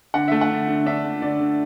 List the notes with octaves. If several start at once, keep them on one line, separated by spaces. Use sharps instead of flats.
D3 F#5
A3 E5
F#5
D3
D3
D4 E5
D3
D3 D5
D3